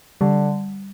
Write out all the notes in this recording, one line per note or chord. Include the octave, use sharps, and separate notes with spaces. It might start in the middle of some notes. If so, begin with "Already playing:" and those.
D3 G3